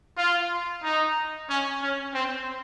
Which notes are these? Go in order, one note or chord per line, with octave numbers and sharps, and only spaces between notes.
F4
D#4
C#4
C#4
C4